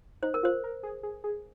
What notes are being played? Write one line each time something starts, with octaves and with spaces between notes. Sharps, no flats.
D#4 C5
A#4
F4 C5
A#4
G#4
G#4
G#4